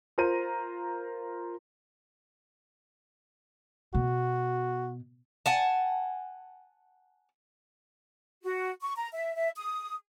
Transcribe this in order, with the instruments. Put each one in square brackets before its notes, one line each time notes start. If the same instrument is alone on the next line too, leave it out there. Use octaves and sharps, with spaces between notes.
[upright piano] F4 A#4 C5 A#5 D#7
[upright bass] B2 [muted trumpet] F#4
[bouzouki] F#5 G#5 A5
[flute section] F#4
C#6
A#5
E5
E5
D#6